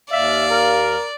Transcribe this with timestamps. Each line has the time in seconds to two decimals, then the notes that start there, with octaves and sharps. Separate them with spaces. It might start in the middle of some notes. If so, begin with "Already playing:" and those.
0.12 D#2 D5 E5 F5
0.51 A#4